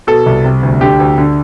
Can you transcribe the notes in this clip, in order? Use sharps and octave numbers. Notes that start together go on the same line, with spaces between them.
B2 A4
C2
C3
D2
D3 G4
D2
D3